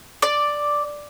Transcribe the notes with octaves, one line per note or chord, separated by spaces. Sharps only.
D5